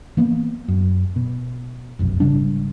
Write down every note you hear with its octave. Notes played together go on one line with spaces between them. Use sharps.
E3 A#3 B3
F#2
B2
F1 B1 F#2
G#1 C#3 G3 D4